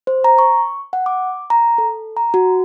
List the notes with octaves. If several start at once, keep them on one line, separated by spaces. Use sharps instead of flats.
C5
A#5
C#6
F#5
D6
A#5
A4
A#5
F#4